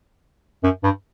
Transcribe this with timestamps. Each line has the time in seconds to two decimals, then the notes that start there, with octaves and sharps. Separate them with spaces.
0.63 F#2
0.83 G2